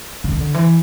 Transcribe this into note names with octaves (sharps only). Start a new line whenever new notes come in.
D3
D#3
D3
E3